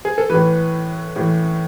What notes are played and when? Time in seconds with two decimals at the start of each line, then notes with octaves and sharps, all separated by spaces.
0.05 G#4
0.18 A4
0.30 A2 E3 B4
1.16 A2 E3